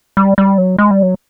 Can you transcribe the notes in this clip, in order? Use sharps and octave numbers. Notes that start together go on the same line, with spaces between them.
G3
G3
F#3
G#3
G3
F#3